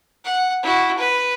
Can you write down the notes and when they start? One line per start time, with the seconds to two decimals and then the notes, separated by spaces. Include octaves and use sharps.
0.24 F#5
0.63 E4 F#4
0.98 B4